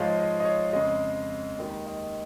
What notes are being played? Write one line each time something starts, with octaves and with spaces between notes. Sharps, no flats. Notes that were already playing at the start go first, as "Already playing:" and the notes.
Already playing: G#2 F3 G#3 C#5 F5
D#5
D#5
C#5
F2 C#3 G#3 D#5
D#2 D#3 G#3
D#5